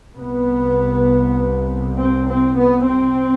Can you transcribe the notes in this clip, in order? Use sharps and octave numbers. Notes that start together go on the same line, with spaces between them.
C2 C3 B3
C4
C4
B3
C4